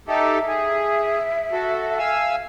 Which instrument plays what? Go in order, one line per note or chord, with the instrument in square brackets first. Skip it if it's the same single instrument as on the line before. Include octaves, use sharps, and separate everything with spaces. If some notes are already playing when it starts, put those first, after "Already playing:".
[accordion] D#4 G4 A4 [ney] E5
[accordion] G#4
F#4 A4
F5 G#5 E6